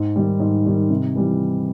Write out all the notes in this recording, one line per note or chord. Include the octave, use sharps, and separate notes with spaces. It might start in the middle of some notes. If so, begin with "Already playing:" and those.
Already playing: G#2
D#3 G3
G#2
D#3 G3
C3
E3 G3